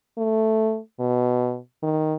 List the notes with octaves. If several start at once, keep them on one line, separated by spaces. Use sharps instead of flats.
A3
B2
D#3